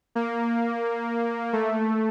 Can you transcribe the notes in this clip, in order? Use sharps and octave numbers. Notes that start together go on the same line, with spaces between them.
A#3
A3